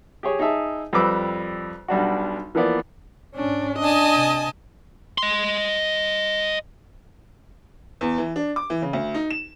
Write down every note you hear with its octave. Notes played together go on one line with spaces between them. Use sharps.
G4 G#4 C#5
D#4 G#4 E5 A5
F2 G3 B4 D6 E6
B1 G3 D4 F#4
E3 F3 A#3 B3 D5
G#2 C#4 D4
D4 D#5 G#5 A5
C3
D#5 C6
E2
E3
D4
D6
E3
C#3
D2
D#4
E7